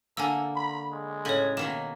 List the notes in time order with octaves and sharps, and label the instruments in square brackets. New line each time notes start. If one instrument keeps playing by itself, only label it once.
[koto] D3 A#3 [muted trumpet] A4 [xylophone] G#5 E6
[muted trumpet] B5
G#3
[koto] A2 C#3 G#5 [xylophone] A4 C#5
[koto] B2 D#3 A#3 [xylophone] E7